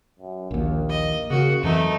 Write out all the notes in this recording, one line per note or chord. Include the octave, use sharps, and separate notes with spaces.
F#2
A#1 D#2 A#3
D#5
C#3 F#4
F2 E3 F#3 A3 D#4